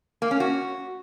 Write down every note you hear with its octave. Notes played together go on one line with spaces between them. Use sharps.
A#3
C#4
F#4